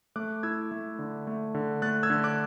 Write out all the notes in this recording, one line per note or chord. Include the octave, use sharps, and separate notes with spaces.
A3 D6 F#6
E4 E6 G#6
A3
D3
A3
D3
A3 F#6 A6
E6 G#6
D3
D6 F#6